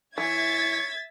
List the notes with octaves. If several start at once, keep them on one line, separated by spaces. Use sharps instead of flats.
E3 C#5 E5 G#6 A6 B6